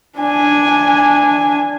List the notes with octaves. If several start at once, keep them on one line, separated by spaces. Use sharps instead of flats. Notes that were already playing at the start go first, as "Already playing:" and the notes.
D4 G#5